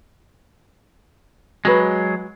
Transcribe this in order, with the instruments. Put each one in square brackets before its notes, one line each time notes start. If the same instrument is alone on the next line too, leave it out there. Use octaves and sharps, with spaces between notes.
[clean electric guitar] F#3 G#3 [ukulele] F#4 B4